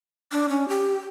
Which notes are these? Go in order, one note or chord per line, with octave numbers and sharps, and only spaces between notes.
D4
C#4
G4